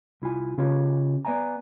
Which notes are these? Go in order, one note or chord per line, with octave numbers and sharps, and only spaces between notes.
C2 E4 F4 G#5
C#3 C#4 F4 G4 C#5
B3 D5 E5 G#5 A#5